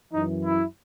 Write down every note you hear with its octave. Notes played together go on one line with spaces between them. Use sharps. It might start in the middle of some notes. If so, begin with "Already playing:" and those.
F#2 E3 D#4
E4